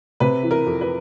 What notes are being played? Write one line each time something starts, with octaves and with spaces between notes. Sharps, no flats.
C3 B4
E3
A#4
F2
B4